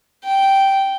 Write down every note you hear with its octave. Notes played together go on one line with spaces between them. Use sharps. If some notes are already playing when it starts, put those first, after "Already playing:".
G5